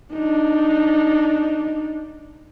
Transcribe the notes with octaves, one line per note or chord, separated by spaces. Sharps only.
D4 D#4